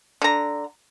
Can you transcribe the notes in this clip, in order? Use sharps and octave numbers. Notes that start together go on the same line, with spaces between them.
D3 A#5